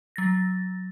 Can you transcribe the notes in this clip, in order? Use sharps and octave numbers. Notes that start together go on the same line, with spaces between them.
F#3 A6 A#6